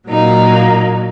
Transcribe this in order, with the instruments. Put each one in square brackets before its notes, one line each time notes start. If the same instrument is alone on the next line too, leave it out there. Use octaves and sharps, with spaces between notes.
[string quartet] A#2 F#3 A#3 D#4